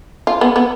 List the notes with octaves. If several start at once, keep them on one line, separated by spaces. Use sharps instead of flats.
F4
B3
B3